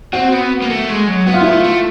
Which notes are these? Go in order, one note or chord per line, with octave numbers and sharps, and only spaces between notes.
C4 F#4
B3
A#3
A3
G#3
F#3
B3 F#4
F4
E4
A3 F4
A3